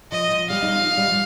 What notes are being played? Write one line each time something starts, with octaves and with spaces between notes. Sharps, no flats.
F3 D#5
F3
G3 F5
D#4
F4
G3
F3